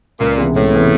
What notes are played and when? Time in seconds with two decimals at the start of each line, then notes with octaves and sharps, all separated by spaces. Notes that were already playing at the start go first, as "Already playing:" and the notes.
0.20 C#2 A#2
0.38 C3 E3 G#3 B3
0.55 C#2 A2
0.73 C3 E3 G#3 B3